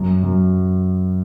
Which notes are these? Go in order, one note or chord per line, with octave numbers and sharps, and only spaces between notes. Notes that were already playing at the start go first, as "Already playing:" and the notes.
Already playing: F#2
F#2